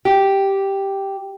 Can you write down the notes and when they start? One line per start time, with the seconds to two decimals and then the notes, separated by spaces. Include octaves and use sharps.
0.05 G4